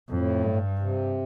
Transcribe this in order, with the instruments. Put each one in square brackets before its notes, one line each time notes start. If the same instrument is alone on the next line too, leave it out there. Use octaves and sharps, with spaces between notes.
[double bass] F2 [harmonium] A2
[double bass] G2
[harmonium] C3